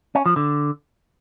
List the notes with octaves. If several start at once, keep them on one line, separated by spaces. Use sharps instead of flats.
C#4
F3
D3